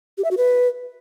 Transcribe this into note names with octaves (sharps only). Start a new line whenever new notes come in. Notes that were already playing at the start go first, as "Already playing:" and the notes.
G4
E5
F#4
B4